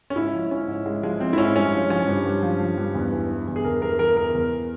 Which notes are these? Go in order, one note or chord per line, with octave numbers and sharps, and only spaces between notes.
C#4
G#2 E4
F3
F3 C#4
G#2
G#2 G#3
F3 G#3
F3 C4
E4
G#2 C#4
G2 C#4
F3
F3 C#4
G2
G2
F3
F3
G2
E2
E3
E3
E2
G#4
E2 A#4
E3 A#4
E3 A#4
E2 A#4
E2